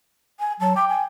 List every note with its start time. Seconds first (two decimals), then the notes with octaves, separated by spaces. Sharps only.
0.40 G#5
0.60 F#3 A5
0.76 G5 D6
0.89 G#5